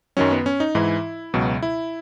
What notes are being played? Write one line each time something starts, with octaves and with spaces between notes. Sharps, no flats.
F#2 D#3 F#3 C#4
B3
C#4
D#4
G#2 E3 E4
C#2 B2 F#3
E4